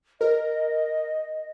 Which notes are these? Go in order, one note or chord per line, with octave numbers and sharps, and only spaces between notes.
A#4 D#5